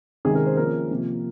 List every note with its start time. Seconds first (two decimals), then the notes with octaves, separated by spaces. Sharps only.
0.25 C3 D#3 G#3 C#4 G#4
0.35 A#4
0.46 C5
0.57 F3 A#3 C#4 A#4
0.91 C3 F3 A#3